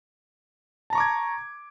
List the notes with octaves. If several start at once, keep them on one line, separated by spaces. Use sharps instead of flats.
A5 A#5 C#6 D6 G#6